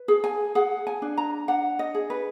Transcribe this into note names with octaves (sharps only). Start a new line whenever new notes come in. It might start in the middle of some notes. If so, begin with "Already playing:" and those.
Already playing: B4
G#4
G#5
G#4 F#5
G#5
D4
A#5
D4 F#5
D#5
G#4
B4